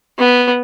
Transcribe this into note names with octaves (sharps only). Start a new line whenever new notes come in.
B3